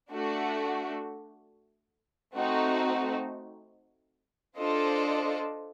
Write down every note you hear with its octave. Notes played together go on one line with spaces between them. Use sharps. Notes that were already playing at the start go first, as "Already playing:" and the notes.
A3 D4 F#4
A3 C4 D#4 F#4
D4 F4 A4 C5 D#5